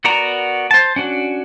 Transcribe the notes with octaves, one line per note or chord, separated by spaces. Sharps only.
B3 F#4 A#4 D5 A#5
C5 A5
C#4 D4 F#4